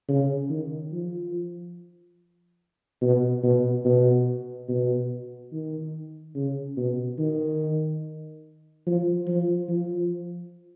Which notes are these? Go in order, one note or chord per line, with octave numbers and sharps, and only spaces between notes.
C#3
D#3
F3
B2
B2
B2
B2
D#3
C#3
B2
D#3
F3
F3
F3